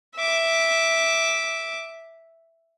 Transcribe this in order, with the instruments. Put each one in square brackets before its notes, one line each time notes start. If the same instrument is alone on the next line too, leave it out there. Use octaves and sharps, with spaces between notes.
[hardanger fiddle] E5 D6